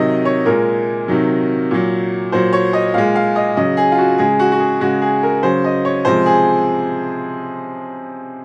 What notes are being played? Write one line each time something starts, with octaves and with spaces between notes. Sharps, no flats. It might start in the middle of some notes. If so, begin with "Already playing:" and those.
Already playing: C3 D#3 F#3 D#5
C#5
A#2 G#3 A#4
C3 D#3 F#3
A#2 F#3
A#2 F#3 C5
C#5
D#5
A#2 G#3 F5
F5
D#5
C#3 F#3 D#5
G#4
F4
F#4
C#3 G#3 G#4
F#4
F#4
G#4
C#3 G#3 F#4
G#4
A#4
C#3 F#3 C5
D#5
C#5
C3 F3 G#3 C5
G#4